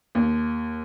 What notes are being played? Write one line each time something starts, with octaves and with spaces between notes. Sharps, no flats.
D#2